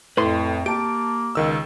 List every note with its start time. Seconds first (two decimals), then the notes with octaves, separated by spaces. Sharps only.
0.17 F2 A2 B4 C6
0.66 A#3 G4 A5 D7
1.35 C#2 D#3 E6